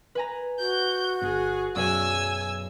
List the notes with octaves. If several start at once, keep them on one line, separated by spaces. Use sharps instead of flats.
B4 G#5 A#5
F#4 G6
G1 G#4
B1 F#2 G#4 D5 G#5 E6